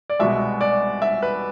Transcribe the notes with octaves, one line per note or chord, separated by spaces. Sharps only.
D5
C2 B2 G#3 E5
D5
E5
B4